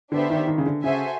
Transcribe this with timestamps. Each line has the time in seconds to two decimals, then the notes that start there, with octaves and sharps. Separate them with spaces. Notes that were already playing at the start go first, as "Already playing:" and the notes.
0.12 D3 B3 D4 G4 C5 E5
0.30 D#3
0.47 D#3
0.58 C#3
0.66 D3
0.83 C#3 F#4 A4 C5 E5 G#5